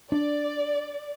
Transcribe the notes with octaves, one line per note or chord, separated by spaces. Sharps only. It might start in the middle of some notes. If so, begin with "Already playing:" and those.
D4 D5